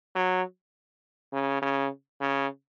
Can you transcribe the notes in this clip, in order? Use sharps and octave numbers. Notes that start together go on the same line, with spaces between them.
F#3
C#3
C#3
C#3